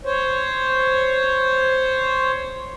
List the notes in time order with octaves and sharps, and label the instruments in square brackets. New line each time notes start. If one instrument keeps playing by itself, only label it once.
[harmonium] C5 C#5